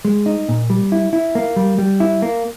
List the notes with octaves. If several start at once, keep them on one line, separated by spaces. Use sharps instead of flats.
G#3
D#4
A#2
G3
E4
E4
A#3
G3
G3
E4
A#3